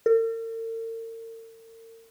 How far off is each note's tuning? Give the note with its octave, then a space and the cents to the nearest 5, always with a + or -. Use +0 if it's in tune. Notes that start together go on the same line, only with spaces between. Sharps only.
A#4 -45